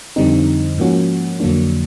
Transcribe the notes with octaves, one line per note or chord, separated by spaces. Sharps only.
F2 D3 G3 C4 D#4
G#2 F3 A#3 C#4 F#4
F2 D3 F#3 A#3 D4